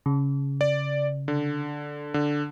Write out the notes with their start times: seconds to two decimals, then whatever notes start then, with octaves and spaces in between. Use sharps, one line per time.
0.06 C#3
0.61 D5
1.28 D3
2.14 D3